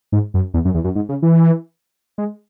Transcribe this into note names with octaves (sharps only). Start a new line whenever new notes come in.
G#2
F#2
E2
F#2
E2
F#2
G#2
C#3
E3
G#3